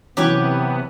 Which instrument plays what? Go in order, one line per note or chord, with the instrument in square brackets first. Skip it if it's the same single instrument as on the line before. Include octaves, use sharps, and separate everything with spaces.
[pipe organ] C3 B3 [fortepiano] E3 F#3 C#4 [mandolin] G4 B4 C#5